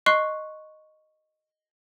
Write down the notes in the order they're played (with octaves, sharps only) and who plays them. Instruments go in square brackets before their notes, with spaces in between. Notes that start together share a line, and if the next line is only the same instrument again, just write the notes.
[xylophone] D#5 C6 C#6 F#6 C7